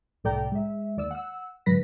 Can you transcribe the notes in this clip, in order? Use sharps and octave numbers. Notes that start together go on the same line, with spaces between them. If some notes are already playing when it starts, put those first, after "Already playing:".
C2 A2 A4 D5 G5 A#5
G#3 E5
D#2 D5 E6
F#5 E6
G#2 D3 F#3 B4 A#6 B6